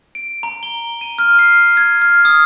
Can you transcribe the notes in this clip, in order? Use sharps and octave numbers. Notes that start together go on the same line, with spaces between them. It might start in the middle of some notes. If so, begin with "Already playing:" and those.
D7
A#5
G7
D#7
F6
C7
G#6
F6
D#6